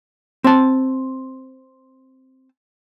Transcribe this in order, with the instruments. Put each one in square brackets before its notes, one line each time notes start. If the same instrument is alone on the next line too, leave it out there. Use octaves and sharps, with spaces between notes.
[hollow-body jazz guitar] C4 A5